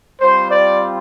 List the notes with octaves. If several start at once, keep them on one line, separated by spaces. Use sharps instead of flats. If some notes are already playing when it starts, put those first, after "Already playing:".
G3 C4 F4 C5
D5